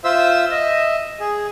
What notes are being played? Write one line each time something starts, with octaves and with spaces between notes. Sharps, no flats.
F4 C5 E5 E6
D#5 E5
G#4